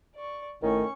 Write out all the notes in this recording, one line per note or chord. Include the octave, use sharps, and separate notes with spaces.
D5 C#6
G#1 A2 D#3 C#4 C#6